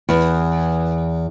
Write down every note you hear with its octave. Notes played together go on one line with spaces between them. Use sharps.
E2